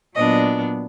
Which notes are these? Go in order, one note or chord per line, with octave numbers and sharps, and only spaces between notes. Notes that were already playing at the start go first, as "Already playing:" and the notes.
A#2 F#3 B3 D4 D#5